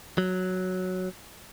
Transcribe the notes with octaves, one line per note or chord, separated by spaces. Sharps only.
F#3